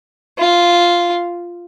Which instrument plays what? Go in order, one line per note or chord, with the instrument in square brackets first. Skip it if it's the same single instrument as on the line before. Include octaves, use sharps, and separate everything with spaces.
[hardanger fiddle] F4